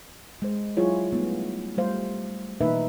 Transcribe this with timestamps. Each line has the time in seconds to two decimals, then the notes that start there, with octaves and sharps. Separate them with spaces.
0.42 G#3 C5
0.77 F#3 E4 F4 G#4 C#5
1.12 G3 A3 B3 D#4
1.78 G3 A3 C5 F5
2.61 B2 E3 A#3 D#4 B4 E5